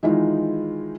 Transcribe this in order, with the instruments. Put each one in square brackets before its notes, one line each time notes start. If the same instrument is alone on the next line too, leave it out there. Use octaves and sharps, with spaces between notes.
[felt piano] D#3 E3 G#3 D#4 F4